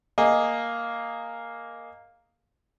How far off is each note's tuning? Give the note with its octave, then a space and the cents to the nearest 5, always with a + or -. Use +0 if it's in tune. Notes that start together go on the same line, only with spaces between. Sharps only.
A#3 +0 G#4 +0 D#5 +0